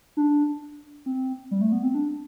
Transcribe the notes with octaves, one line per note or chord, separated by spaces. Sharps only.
D4
C4
G3
A3
B3
C4
D4